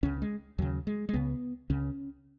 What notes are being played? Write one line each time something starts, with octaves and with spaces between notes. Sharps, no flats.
C#2 C#3 C#4
G#3
D#2 C#3 F#3
G#3
G#3
C#2 C#3 B3
C#2 C#3 C#4